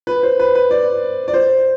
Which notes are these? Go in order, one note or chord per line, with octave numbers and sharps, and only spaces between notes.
B4
C5
B4
B4
D5
D5
C5